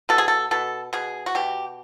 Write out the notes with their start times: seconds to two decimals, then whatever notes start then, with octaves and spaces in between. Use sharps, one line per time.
0.09 B2 A4
0.18 G#4
0.28 A4
0.51 B2 A4
0.93 B2 G#4
1.26 F#4
1.35 B2 G4